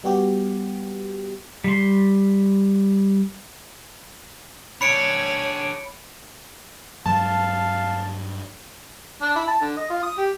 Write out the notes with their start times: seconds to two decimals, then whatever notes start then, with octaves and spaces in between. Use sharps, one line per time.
0.04 G3 B3 F#4 G4
1.64 G3 C6
4.81 D4 G#4 C#5 B5 C#7 D7
7.06 G2 F#3 G#3 F5 A5
9.22 D4
9.36 E4
9.48 A5
9.61 D3
9.77 D#5
9.90 F4
10.03 D#6
10.18 G4